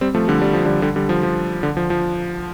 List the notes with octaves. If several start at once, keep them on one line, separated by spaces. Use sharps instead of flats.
G3 C4
F3 A3
D3 G3
G3
F3
D3 G3
D3 G3
D3 G3
F3
F3
D3
F3
F3